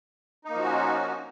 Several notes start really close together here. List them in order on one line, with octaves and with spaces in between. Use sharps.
D#4 A#3 F3 F#4 C#4